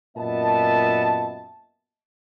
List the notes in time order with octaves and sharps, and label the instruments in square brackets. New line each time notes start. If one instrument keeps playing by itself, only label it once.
[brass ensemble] F#2 A#2 B3 D#5 E5 A5